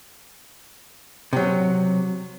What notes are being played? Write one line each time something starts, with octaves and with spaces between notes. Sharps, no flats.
C3 F#3